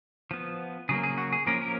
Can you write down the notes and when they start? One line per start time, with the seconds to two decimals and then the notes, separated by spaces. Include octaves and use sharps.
0.31 F3 B3
0.89 C#3 F#3 A#3 G#4
1.03 G#4
1.18 F#4
1.32 G#4
1.46 F3 A#3 C#4 A#4
1.62 A#4